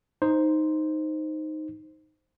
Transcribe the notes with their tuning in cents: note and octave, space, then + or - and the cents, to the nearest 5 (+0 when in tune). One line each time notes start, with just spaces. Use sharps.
D#4 +0 C5 +0